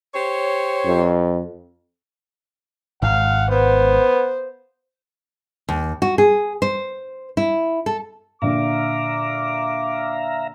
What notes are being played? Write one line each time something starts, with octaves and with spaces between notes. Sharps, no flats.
G4 C5 C#5
F2
G#1 G#2 F5 F#5
B3 C5
D#2
F#4
G#4
C5
E4
A4
A#2 D3 E5 F5 A#5 D6